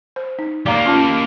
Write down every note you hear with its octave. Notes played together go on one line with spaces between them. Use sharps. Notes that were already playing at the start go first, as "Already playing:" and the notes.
C5
D#4
A#3 G4 D5 F5 A#5
C#4 F4 A5